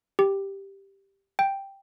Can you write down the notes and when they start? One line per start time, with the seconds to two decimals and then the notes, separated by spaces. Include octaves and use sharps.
0.19 G4
1.39 G5